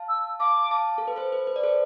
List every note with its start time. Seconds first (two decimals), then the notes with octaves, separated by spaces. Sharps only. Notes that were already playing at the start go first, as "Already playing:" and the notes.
Already playing: F5 A5
0.09 E6
0.40 F5 A5 D6
0.71 F5 A5
0.98 A4
1.08 B4
1.16 A4 C5
1.32 B4
1.47 B4
1.56 D5
1.63 A4 C5